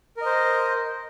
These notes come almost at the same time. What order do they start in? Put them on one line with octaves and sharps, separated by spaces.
A#4 D#5 C5